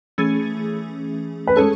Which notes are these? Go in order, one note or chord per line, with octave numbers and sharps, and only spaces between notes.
E3 A3 C#4 G#4
B4
G#3 C#4 G#4 A4 C#5